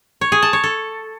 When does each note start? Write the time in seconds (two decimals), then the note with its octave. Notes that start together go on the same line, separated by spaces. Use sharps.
0.21 C#5
0.32 G#4
0.42 A5
0.53 C#5
0.64 A4